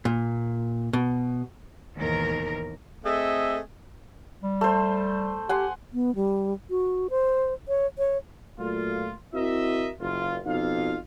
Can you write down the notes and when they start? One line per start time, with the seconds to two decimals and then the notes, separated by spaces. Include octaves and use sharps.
0.05 A#2
0.93 B2
1.96 D#2 G#2 B2 E3 A#4
3.05 A3 C4 G#4 A4 D#5 E5
4.43 G3
4.61 A3 C5
5.49 G4 F#5 G#5 C6
5.93 B3
6.15 G3
6.70 F#4
7.10 C5
7.68 C#5
7.98 C#5
8.59 A#2 F#3 A3 F4
9.34 C4 E4 F#4 A#4 D#5 E5
10.00 F#1 F4
10.45 F2 B2 D#4 F4 F5